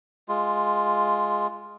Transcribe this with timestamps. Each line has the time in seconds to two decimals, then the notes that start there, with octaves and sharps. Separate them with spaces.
0.28 G#3 F4